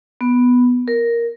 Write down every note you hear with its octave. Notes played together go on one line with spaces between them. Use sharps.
B3
A#4